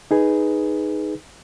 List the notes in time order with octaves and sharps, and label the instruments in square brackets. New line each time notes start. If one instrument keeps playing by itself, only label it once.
[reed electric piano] D#4 G#4 B4